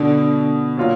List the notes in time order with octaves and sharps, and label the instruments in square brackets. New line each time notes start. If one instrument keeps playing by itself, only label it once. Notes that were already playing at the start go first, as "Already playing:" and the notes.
Already playing: [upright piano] B2 [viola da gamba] D3
[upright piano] A#2 F#3 A#3 F4